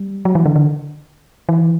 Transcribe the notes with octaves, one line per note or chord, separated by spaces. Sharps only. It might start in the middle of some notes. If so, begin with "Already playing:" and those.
Already playing: G3
F#3
E3
D3
D3
E3